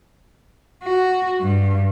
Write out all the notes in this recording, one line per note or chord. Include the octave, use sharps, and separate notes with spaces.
F#4
G2